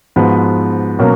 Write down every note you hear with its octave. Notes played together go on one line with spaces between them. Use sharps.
G#2 F3 B3 F#4 B4
B2 F#3 A#3 C#4